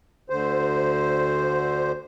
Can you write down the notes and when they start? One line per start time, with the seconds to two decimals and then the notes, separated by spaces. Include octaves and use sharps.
0.30 D2 D3 C5